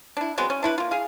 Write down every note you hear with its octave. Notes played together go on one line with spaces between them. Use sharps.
D4 E4
F#3 G#3 B3 C4
C#4
D4 E4 B4
A#3 F4
G#4 F5